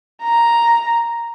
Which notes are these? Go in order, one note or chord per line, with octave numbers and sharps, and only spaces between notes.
A#5